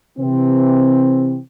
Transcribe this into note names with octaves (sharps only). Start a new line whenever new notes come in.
C3 E3 C4